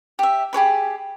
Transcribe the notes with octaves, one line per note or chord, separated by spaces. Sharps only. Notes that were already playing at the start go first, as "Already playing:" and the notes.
G4 E5
G4 G#4 C#5 B5